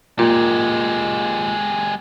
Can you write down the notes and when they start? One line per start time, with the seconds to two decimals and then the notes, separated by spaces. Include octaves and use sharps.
0.19 A#2 G#3 G4